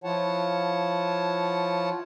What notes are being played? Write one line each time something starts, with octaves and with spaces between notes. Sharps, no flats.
F3 E4 F4 C#5 F#5 A5